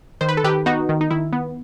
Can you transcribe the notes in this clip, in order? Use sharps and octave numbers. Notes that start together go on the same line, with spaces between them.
D#3 C5
B4
A4
D#3 G4 B4
B3 D#4 F#4
D#3
D#4
D#3 E4
B3